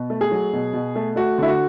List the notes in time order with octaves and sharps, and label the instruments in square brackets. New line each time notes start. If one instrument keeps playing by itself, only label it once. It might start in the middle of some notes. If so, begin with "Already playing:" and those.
Already playing: [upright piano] B2
A3
G#4
F#3
B2
B2
A3
A3 F#4
D3 E4
F#4